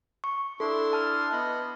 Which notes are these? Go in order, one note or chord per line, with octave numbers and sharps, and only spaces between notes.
C#6
D4 E4 A4 C6
A5 F6
B3 D#5 B5